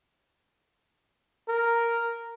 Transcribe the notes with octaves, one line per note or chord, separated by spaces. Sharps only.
A#4